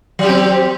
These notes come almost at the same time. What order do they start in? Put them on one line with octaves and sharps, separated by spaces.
F#3 G4 C4